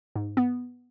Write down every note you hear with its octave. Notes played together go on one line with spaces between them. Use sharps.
G#2
B3